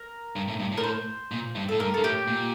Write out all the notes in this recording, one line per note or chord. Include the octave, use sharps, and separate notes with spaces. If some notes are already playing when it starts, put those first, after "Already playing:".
Already playing: A#4
G2
A2
G2
A2
A#4
C5
A#2
G2
A2 A4
G2 A#4
G2 A4
A2 G4
A#2